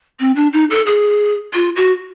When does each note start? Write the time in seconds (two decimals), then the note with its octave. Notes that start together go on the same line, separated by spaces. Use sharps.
0.20 C4
0.36 D4
0.53 D#4
0.70 A4
0.86 G#4
1.53 F4
1.76 F#4